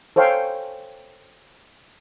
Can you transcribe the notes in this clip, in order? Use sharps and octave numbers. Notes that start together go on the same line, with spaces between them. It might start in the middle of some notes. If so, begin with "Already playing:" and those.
A4 C5 C#5 F5 G5 G#5